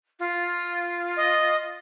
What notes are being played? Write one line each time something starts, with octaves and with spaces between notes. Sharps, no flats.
F4
D#5